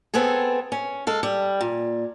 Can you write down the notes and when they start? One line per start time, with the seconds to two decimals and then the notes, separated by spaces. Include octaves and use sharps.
0.14 B3 C4 G#4 A4
0.72 C#4
1.07 G#3 A4 F5
1.23 G3
1.61 A#2